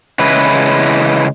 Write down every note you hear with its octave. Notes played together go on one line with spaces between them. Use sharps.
C#3 E3 G#3 E4 B4